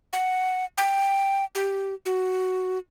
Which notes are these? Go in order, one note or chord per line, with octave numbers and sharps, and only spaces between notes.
F#5
G5
G4
F#4